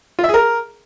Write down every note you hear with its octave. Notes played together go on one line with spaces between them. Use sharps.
F4
E5
G#4
A#4